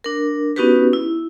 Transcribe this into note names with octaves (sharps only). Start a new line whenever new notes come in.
D4 A#4
B3 C#4 D#4 F#4 G4 B4
E4